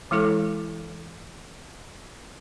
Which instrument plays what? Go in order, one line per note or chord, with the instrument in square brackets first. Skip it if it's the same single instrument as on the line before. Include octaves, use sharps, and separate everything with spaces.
[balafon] E3 G#3 E4 A4 D6